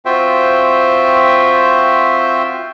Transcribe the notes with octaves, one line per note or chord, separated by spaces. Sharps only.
C4 F4 F#4 C5 E5 G5